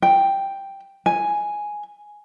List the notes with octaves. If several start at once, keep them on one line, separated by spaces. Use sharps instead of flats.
G5
G#5